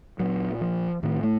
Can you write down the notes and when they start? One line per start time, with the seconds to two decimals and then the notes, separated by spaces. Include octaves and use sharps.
0.20 A#2 F#3
0.61 F3
1.03 A2 D#3
1.23 A3